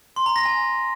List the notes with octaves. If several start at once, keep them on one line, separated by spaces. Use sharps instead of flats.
C6
A#5
A#6
G#5